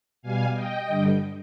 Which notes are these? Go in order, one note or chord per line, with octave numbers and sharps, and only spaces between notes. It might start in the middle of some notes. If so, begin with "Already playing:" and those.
B2 G3 F5 G#5
D#5 G5
G2 D3 G3